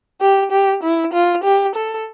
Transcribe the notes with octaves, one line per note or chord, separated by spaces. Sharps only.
G4
G4
E4
F4
G4
A4